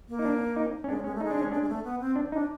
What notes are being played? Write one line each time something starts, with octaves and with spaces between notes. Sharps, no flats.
A#3
D#4
D4
D#4
C#4
G#3 D4
G#3 C#4
A3
G#3 D#4
D4
C#4
G#3 D4
G#3
A3
B3
C4
D4
D4 D#4